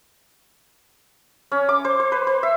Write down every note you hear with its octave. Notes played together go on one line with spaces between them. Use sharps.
C#4
D6
C5
C5
B4
C5
E5